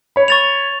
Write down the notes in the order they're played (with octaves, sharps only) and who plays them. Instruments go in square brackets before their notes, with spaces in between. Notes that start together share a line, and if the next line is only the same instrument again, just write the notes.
[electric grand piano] C#5 B5
[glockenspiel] C#6 A6 F7